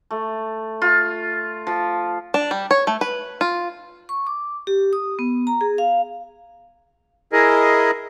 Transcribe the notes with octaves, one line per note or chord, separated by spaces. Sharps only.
A3
F4
F3
D4
G3
C#5
A3
B4
F4
C#6
D6
G4
D#6
B3
A#5
G#4
F5
E4 G#4 A#4 D#5